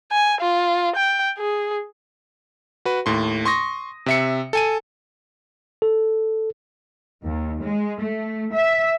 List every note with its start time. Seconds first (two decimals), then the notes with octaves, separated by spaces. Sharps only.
0.12 G#5
0.41 F4
0.96 G5
1.38 G#4
2.85 F#4 B4
3.06 D#2 A2 C6
3.45 C6 C#6 D#6 A#6
4.06 C3 E5 C#7
4.53 A4 G#5 D#7
5.82 A4
7.24 D#2
7.62 G#3
8.00 A3
8.52 E5